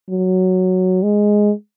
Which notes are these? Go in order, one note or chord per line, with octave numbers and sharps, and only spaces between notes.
F#3
G#3